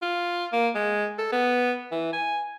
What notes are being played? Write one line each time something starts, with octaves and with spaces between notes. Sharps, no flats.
F4
A#3
G#3
A4
B3
E3
G#5